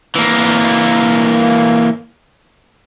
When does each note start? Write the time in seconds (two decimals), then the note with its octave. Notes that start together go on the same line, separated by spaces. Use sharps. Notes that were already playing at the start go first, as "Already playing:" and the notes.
0.16 E3 A#3